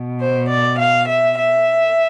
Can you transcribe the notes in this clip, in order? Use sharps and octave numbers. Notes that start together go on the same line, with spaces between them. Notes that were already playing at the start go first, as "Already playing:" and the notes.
Already playing: B2
C5
D5
F5
E5
E5